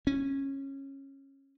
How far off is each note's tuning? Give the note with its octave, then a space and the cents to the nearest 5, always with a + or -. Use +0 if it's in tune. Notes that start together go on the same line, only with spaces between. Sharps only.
C#4 -20